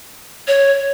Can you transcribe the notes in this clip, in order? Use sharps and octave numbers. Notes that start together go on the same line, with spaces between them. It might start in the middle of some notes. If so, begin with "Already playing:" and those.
C#5